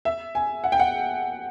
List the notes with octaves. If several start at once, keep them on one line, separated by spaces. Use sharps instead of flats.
E5
G#5
F#5
G5
F#5